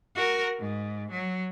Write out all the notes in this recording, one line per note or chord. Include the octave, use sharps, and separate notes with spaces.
F#4 A#4
G#2
F#3